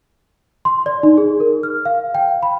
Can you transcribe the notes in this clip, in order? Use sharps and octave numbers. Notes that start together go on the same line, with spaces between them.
C6
D5
D#4
G#4
A#4
F6
F5
G5
B5